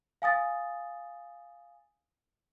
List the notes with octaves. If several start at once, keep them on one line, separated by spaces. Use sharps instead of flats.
F5 G#5 D#6 A6